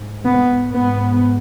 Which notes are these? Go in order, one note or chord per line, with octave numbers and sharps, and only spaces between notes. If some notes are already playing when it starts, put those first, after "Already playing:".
Already playing: G#2
B3
G#2 B3